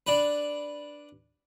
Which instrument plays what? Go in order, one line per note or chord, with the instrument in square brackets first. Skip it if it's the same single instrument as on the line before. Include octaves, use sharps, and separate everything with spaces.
[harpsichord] D4 B4